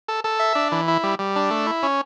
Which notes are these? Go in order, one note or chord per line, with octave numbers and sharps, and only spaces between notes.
A4
A4
E5
D4
E3
E4
G3
G3
D4
A3
E4
C#4